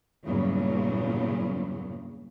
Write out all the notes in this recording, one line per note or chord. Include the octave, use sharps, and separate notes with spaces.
E2 G2 A#2 C#3 F#3